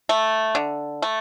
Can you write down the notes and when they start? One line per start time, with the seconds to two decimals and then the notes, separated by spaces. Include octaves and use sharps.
0.09 A3
0.55 D3
1.02 A3